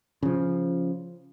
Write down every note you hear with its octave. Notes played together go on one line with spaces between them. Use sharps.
C#3 F3